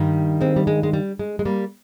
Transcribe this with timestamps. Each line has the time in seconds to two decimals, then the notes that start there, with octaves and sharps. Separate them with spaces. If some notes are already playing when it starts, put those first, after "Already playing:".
Already playing: G2 D#3 G3
0.41 G#3 C4
0.56 G3
0.67 G#3
0.83 G#3
0.93 G3
1.19 G#3
1.39 G#3
1.45 G3 A#3